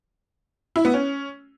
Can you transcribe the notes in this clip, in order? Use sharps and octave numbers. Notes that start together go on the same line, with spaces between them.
E4
B3
C#4